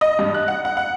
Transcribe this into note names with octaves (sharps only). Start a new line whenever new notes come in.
D#5
G2
F#6
F#5
F#5
F#5